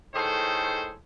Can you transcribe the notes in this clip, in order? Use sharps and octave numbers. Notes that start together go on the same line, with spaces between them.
A2 D#3 G#4 A4 C5